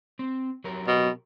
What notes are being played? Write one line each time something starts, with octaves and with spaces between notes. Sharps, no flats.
C4
F#3 G4 A#4
B2